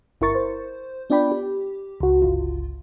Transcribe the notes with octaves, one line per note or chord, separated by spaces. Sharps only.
G1 E4 A#4 C#6 A6 C#7
C5
B3 D4 F4 D5 G5 B5
G4
C#2 F#4
G1 C#2 F4